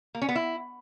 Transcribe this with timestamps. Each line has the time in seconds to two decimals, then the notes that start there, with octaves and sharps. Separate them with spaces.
0.15 A#3
0.22 C#4
0.29 B3
0.35 E4